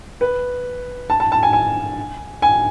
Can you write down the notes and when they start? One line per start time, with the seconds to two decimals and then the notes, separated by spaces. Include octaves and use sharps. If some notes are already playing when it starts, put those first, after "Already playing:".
0.21 B4
1.10 A5
1.20 A5
1.32 A5
1.43 G#5
1.53 G#5
2.42 G#5